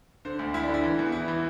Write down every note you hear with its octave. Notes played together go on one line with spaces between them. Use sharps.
D3 C5
D2
D2 E4
D4
D3
E4
E3
E2
E2 E4
E3